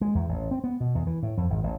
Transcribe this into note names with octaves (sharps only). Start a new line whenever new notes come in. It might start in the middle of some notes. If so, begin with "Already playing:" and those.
G#3
E2
A1
C4
B3
B2
E2
E3
A2
F2
G#1
A1